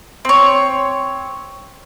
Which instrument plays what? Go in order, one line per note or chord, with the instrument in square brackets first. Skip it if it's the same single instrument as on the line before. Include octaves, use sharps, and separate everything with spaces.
[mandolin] C4 C#5